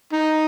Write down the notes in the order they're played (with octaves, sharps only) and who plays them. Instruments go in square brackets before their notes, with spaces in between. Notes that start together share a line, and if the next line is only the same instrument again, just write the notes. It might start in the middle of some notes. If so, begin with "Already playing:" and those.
[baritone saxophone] D#4